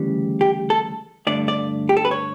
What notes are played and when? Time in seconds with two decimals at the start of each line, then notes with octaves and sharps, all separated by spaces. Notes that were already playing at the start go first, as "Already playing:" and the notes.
Already playing: D2 C#3 E3 G3
0.41 G4
0.70 A4
1.27 G2 D3 A3 D5
1.48 D5
1.89 G4
1.97 A4
2.05 B4
2.11 C#5